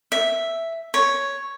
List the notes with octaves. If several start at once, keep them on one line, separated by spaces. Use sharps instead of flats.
E5
C#5